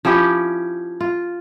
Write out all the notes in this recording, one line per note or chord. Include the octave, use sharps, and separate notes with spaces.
F3 C#4 E4 G4
F4